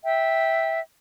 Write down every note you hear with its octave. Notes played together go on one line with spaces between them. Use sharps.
E5 G5